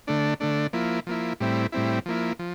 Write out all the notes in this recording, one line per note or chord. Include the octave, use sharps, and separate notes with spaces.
D3 A3 D4
D3 A3 D4
F3 A#3 E4
F3 A#3 E4
A2 G3 C4 E4
A2 G3 C4 E4
F3 A#3 E4
F3